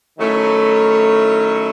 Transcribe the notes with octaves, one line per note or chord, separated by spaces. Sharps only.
D#3 F#3 A3 C#4 E4